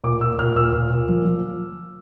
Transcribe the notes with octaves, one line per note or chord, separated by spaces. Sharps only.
A#2 D6
A#2 E6
A#2 F6
A#2 E6
A#2
A#2
F3
F3